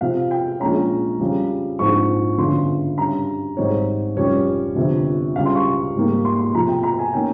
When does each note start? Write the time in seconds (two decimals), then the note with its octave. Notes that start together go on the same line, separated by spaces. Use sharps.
0.01 F2 C3 F3 F5
0.31 G5
0.60 A#1 A#2 G#3 C#4 A#5
1.19 F2 C#3 G3
1.79 A#1 G#2 F3 C4 C#6
2.38 G1 F2 C#3 C6
2.98 G2 G3 C#4 A#5
3.57 G#1 G#2 G3 C4 D#4 C#5
4.17 F1 F2 C#3 G3 C#4 C#5
4.76 G1 F2 C3
5.36 C#2 C#3 G3 F5
5.45 C6
5.55 C#6
5.94 G#2 G3 A#3
6.25 C6
6.39 C6
6.54 F2 C3 F3 A#5
6.68 G5
6.83 A#5
6.99 G#5
7.14 D#3 A#3 C#4 G5